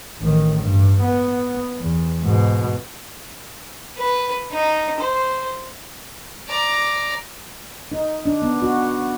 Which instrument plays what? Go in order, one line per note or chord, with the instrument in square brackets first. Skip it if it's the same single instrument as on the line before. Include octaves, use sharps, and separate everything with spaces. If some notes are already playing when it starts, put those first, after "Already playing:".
[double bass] A1 D#3
G2
B3
E2
G#2 B2
[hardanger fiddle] B4
D#4
C5
D5 A#5
[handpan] D#4
D4
B3
F#4